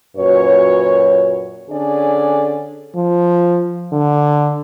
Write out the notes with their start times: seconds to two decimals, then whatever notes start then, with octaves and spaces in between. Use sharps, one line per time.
0.17 F#2 A#2 F#4 B4 C#5
1.70 D3 C#4 D4 G#4 A4 D5
2.96 F3
3.92 D3